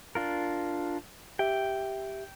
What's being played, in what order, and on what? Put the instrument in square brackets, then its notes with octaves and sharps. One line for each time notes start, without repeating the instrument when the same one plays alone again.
[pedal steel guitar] D4 F4 A#4
[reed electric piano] G4 E5 [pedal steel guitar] G5